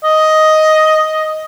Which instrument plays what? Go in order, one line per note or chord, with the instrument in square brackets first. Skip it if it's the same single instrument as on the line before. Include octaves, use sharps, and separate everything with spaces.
[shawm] D#5